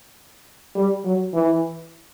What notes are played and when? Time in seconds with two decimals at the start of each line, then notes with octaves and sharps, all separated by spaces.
0.75 G3
1.05 F#3
1.34 E3